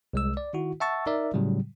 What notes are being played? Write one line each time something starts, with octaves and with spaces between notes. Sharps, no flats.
C2 G#3 E6
D5
D#3 E4 F#4
E5 F#5 A5 C#6 E6 A6
D#4 A#4 D5 E5
A2 C#3 F#3 G3